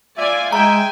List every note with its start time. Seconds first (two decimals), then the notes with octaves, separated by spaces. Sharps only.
0.18 F4 D5 E5 G#5
0.52 G#3 E5 G5 G#5 A#5